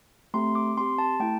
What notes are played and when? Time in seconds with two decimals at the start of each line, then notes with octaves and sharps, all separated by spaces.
0.34 A3 C4 G4 C6
0.55 D6
0.77 C4 G4 C6
0.98 A5
1.20 A3 E4 G5